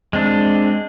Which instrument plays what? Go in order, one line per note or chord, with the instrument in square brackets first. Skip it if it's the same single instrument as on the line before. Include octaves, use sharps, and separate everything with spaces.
[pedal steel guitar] G#3 C4 D4